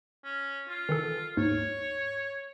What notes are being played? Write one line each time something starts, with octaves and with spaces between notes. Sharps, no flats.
C#4
F4
D#3 E3 A4
D#2 G#2 C#5